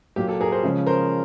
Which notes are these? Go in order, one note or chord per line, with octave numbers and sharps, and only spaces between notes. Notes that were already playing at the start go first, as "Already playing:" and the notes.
A#2 F#3 A#3 G4
G4 A4
G#4 A#4
A#4 C5
C#3 F3 G#3 C#4
A#4 C5